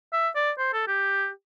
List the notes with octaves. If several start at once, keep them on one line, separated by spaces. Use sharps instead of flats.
E5
D5
C5
A4
G4